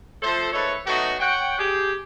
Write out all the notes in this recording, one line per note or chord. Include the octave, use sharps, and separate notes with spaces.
F3 A3 A4 C5
G#2 A3 A4 B4 C#5
F#3 A3 B3 D#4 F#4
C#5 F#5 G5
G4 G#4